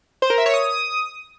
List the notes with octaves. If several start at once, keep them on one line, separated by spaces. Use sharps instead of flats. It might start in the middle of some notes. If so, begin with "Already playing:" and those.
C5
A#4
E5
C#5
D#6